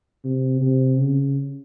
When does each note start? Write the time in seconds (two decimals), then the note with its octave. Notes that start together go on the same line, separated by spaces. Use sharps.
0.24 C3
0.61 C3
0.98 C#3